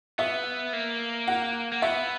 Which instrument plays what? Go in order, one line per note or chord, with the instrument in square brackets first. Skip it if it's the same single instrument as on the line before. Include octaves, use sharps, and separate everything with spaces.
[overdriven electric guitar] B3 [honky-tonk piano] E5
[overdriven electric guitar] A#3
[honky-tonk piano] F#5
[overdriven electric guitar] A#3
[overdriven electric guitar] B3 [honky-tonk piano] E5